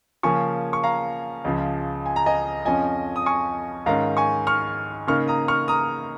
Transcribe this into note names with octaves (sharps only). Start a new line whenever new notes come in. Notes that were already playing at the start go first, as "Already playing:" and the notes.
C#3 F3 A#3 C#4 G#5 C#6
C#6
F5 A#5
C#2 C#3 F3
G#5
A#5
D#5 G#5
F2 F3 C#4 D#5 G#5
D#6
G#5 C#6
G#2 D#3 C#4 F5 A#5
G#5 C#6
C#6 F6
C#3 A#3 D#4 C#6 F6
A#5 D#6
C#6 F6
A#5 D#6